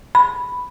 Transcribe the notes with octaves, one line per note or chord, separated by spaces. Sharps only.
B5